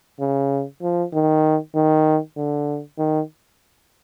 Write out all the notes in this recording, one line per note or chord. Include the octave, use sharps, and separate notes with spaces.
C#3
F3
D#3
D#3
D3
D#3